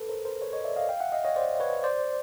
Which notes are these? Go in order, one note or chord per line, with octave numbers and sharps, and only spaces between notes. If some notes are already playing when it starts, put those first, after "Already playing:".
Already playing: A4 B4
A#4 C5
A#4 C5
B4 C#5
C#5 D#5
D5 E5
D#5 F5
F5 G5
E5 F#5
D#5 F5
C#5 D#5
C5 D5
B4 C#5
C5 D5